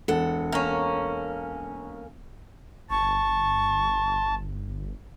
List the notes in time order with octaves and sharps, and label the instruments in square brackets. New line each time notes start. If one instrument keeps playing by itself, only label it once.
[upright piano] E1 [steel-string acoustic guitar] A4 F#5
[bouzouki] A#3 C#4
[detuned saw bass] G1 [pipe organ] A5 [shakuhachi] C#6